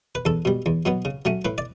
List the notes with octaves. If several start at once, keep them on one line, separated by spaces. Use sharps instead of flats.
B4
E2 A4
B2 G3
E2
B2 F#3 B3
C#3
F#3 A3 C#4
A2 B4
D5